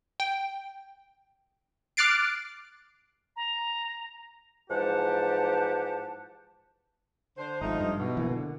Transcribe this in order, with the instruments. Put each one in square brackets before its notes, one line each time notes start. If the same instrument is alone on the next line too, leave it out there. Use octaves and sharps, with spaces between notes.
[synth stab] G5
D6 F6 F#6 A6 C7 D7
[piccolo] A#5
[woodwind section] G#2 E3 F3 G4 F#5 A5
[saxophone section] D3 C5
[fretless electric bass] G#1 [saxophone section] F3 A3 D#4
[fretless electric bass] G2
[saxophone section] B2
[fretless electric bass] E3 A#3
D3